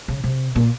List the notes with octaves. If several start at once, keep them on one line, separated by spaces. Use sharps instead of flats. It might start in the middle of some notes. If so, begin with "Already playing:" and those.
C#3
C3
A#2